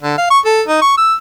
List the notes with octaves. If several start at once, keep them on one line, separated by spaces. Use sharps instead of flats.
D3
F5
C#6
A4
D#4
C#6
E6